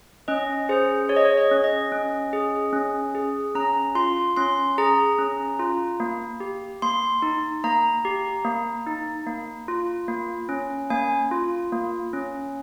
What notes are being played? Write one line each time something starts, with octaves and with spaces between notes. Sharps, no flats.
C#4 D#5
G#4 C5
G#4 C#5
D#5
C#5
D#5
C#4
D#5
C#4
G#4
C#4
G#4
C#4 A#5
F4 C6
C#4 C6
G#4 A#5
C#4
F4
A#3
G4
A#3 C6
D#4
A#3 A#5
G4
A#3
D#4
A#3
F4
A#3
C#4
A#3 G#5
F4
A#3
C#4